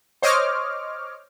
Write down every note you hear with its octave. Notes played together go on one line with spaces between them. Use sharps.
C5 C#5 D#5 D6 F6